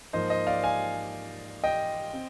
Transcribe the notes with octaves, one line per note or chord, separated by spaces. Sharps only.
G#2 F3 A#3 C5 D#5
C5 D#5
D5 F5
F5 G#5
D#5 G5
C4